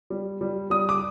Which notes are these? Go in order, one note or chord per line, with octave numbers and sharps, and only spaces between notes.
G3
G3
G3 D#6
D6